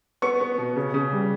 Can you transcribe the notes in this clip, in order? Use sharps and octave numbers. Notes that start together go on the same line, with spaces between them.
B3 C#6
B3
B2
C#3
C#3
G3